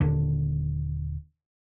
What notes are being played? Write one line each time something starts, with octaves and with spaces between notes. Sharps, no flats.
D#1 D#2 D3